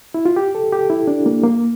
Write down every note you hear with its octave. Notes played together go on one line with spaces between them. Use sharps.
E4
F4
G4
A4
G4
E4
D4
A#3
A#3